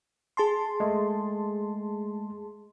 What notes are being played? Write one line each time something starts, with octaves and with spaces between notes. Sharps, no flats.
G#4 A5 C6
G#3 A3